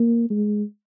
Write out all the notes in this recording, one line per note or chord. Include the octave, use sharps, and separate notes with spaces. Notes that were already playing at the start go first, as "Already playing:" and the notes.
Already playing: A#3
G#3